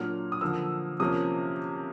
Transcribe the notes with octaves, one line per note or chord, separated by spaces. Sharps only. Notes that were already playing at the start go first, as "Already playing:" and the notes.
Already playing: A#2 F#3 A#3 D4 F6
D#6
D3 F3 A#3 E6
C3 F3 A#3 C#4 D#6